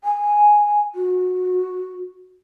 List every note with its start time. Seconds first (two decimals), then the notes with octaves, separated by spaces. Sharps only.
0.04 G#5
0.95 F#4